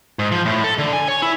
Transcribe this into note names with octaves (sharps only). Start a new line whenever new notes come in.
G#2
F3
A2
A4
D3
G#5
C#5
E4